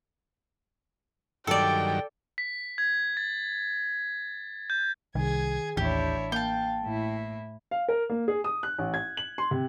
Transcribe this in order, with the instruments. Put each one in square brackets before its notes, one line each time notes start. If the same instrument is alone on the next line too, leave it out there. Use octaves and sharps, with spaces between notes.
[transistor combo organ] G2 D#3 F#3 [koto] A4 D5 [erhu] G5
[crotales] B6
G#6
A6
G6
[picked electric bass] C2 [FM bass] D#3 [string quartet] G#4 G#6
[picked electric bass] A1 [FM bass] D#2 [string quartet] D4 E4 C#5 [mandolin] G4
[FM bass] A#3 [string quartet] F5 [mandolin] G5 A5
[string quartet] A2 E4
[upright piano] F5
A#4
A#3
G#4
D#6
F#6
A1
G#6
F#7
C6
C3